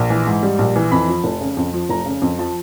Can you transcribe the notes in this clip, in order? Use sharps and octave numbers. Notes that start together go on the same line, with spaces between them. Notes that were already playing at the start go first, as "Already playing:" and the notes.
Already playing: A#1
E3
G#2
G3
A#1
E3
F2 B5
F3
F1
C#3
F2
F3
F1 A#5
C#3
F2
F3 A5